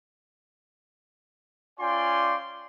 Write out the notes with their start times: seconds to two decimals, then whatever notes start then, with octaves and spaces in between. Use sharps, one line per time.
1.80 C#4 F4 D5 G5 G#5 C6